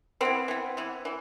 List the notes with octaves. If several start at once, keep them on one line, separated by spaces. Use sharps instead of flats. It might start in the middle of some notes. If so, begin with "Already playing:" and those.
E3 B3 C4
E3 B3
E3 B3
E3